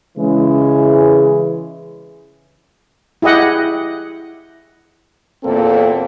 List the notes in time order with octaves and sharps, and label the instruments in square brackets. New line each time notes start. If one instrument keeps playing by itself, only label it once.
[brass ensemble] C#3 E3 G#3
[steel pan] E4 G4 G#4 D#5 F#5
[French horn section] E2 A#2 A#3 C4 A4